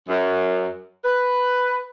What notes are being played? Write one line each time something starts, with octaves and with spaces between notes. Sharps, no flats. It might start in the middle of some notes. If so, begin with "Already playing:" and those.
F#2
B4